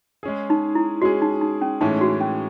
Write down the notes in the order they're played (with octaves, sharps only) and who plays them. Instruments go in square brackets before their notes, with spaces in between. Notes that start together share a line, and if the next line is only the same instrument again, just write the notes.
[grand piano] G#3 C#4 G#4
[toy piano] D#4
E4
[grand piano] G#3 C#4 G#4 [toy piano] F#4
[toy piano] D#4
D#4
C#4
[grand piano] A2 E3 G#3 C#4 [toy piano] D#4
[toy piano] F#4
C#4